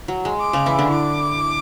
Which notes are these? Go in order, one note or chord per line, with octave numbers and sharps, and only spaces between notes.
F#3
G#3
D6
C#3 C#4
E3 E4
D3 D4
D6